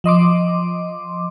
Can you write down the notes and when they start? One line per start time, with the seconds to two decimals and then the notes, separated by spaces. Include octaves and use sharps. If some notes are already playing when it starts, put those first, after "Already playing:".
0.04 F3 D#5 C6 D6